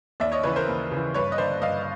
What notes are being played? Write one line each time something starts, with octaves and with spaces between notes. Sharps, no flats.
D#2 D5 E5
C#5 D#5
C#3 E3 B4 C#5
A#4 C5
D#2
C#3 E3
G2 B4 C#5
D#5
D3 C5 D5
G2 D#5 F5